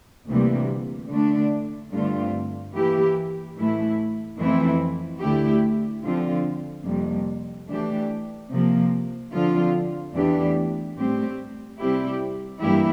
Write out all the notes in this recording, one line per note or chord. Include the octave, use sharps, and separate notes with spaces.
D2 C3 E3 G3 A#3
D3 A3 D4
G2 D3 A3 C4 F4
E3 A#3 E4 G4
A2 E3 A3 E4
F2 E3 A3 C4 E4
D2 D3 A3 E4 G4
D3 F3 C4 F4
F2 C3 G3 A#3
E3 A3 D4 G4
C3 F3 A#3
D3 F3 C4 F4
E2 E3 A3 D4 G4
A2 G3 C4 G4
C3 G3 C4 E4 G4
G2 E3 A#3 E4 G4